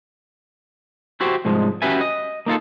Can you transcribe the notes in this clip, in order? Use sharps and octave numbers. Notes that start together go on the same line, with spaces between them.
E4 F#4 G4 C5
C2 G#2 F3 G#3
C#4 F#4 G4 B4 E5 G#5
D#5
A#3 D#4 F4 A4